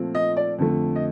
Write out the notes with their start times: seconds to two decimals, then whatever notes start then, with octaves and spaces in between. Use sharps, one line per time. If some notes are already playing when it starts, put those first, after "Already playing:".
Already playing: A#2 F3 A3 C4
0.15 D#5
0.37 D5
0.59 F2 D3 A3
0.96 D#5